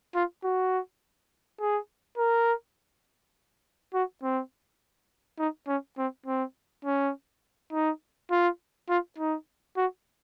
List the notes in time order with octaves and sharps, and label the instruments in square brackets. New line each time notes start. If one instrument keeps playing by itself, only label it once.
[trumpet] F4
F#4
G#4
A#4
F#4
C4
D#4
C#4
C4
C4
C#4
D#4
F4
F4
D#4
F#4